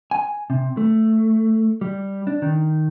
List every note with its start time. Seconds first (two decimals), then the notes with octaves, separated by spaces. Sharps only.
0.11 G#5
0.50 C3
0.77 A3
1.81 G3
2.27 D4
2.42 D#3